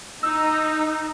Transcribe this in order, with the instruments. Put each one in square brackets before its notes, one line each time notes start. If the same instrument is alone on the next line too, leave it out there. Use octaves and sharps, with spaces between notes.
[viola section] D#4 [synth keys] E6